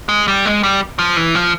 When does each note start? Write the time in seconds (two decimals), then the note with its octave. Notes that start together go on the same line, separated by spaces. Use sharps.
0.09 G#3
0.28 G3
0.45 G#3
0.63 G3
0.99 F3
1.17 E3
1.35 F3